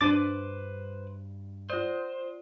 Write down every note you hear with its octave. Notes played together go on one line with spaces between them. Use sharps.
G2 F3 G3 D4 B4 C5 D6 A6
F4 C5 D5